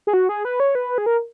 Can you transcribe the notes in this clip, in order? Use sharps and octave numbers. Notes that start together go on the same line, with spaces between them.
G#4
F#4
G#4
B4
C#5
B4
G#4
A#4